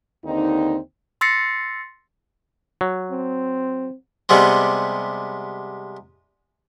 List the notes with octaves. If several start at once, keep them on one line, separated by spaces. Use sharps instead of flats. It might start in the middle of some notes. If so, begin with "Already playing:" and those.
D#2 D3 C4 D#4
C6 E6 A6 A#6 C7 C#7
F#3
C4
C3 G3 G#3 B3 C4